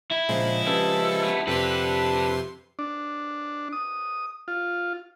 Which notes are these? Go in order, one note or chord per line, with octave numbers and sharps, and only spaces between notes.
E4
A#2 C#3 F3 G#3 C5
C#4 G4 A4 B4
A3 B3
F2 C3 D4 G4 A4 B4 C6
D4
D#6
F4